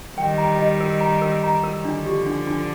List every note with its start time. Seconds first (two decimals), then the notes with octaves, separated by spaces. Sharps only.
0.18 D#3 G3 G5
0.38 A#5
0.59 D#5
0.80 A#4
1.01 A#5
1.22 A#4
1.43 A#5
1.64 A#4
1.85 D3 F3 D4
2.06 G4
2.26 D4
2.47 D4